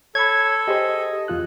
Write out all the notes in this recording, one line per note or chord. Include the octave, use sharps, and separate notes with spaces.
A4 C#5 B5 G#6
G4 G#4 C5 D#5
E2 F4 F#6